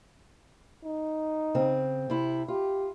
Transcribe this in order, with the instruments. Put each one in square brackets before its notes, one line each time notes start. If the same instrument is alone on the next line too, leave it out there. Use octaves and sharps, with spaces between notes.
[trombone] D#4
[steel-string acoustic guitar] C#3 C4
C3 E4
[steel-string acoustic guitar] F4 [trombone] G4